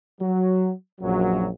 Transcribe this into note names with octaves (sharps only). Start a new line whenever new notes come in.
F#3
A#1 F#2 F#3